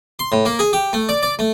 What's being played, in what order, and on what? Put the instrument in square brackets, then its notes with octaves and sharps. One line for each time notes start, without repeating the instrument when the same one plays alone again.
[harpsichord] C6
A2
A#3
G#4
G4
A3
D5
D5
A3